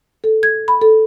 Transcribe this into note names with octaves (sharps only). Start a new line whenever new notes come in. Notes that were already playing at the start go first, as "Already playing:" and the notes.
A4
G#6
B5
A4